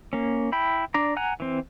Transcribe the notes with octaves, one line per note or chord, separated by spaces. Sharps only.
A#3 C#4
E4 G5 B5
D4 D5 A#5
F#5 G#5 A#5 F#6
E3 C4